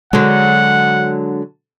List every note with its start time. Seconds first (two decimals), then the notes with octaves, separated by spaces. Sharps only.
0.13 D3 F#3 G#3 F#5